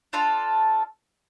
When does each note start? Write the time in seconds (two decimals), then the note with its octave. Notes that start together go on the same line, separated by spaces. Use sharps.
0.13 D4 F4 A4 F5